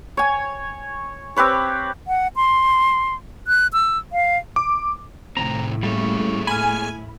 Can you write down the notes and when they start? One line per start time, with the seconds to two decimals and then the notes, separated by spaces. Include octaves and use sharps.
0.17 C#5 G#5
1.36 C4 G4 B4 C#5
2.07 F#5
2.36 C6
3.47 F#6
3.73 E6
4.12 F5
4.56 D6
5.37 A2 C3 D#3 C4 E4 A#5
5.83 G3 A#3 C#4 G#4 A4
6.47 G#5 B5 F6